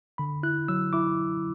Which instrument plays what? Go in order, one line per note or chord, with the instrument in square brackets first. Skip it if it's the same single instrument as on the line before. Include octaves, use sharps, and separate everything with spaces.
[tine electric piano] D3 B5
E4 F#6
F#3 E6
E4 D6